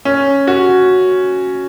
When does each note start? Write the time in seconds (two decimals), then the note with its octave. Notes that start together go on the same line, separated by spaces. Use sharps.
0.05 C#4
0.47 F#4